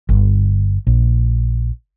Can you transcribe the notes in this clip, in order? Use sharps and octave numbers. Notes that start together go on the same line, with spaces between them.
G1
A#1